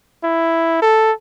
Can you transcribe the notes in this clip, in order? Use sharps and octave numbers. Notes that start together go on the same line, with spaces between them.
E4
A4